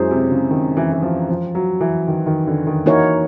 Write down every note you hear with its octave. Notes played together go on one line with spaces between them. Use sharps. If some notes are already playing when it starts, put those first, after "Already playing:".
Already playing: F#2 G#3 C#4 E4 G#4 C5
C3
C#3
D#3
E3
E3
F3
F3
F#3
E3
D#3
D#3
D3
D#3
E3 A#3 D#4 F#4 A#4 C#5